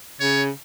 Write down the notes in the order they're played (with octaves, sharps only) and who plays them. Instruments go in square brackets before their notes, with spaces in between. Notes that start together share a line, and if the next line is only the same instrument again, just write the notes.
[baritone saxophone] C#3 [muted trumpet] C#5